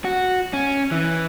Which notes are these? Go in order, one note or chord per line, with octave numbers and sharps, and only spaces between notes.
F#4
C#4
E3